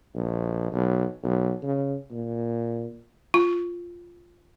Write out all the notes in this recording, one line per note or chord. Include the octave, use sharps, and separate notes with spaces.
A#1
B1
B1
C#3
A#2
F4